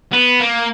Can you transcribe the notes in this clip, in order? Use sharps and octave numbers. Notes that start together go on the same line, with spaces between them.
B3
A#3